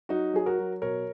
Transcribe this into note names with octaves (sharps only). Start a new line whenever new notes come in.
F#3 D#4 F#4
F#3 G#4
F#4 A#4
F#3
B2 A#4 C#5